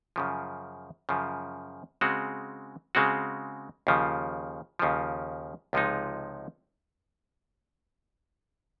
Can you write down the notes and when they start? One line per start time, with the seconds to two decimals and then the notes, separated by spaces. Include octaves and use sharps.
0.16 F#2 C#3 F3
1.09 F#2 C#3 F3
2.01 C#3 G#3 C4 F#4
2.95 C#3 G#3 C4 F#4
3.87 D#2 C#3 F3
4.79 D#2 C#3 F3
5.73 C#2 C3 F3 G#3 D#4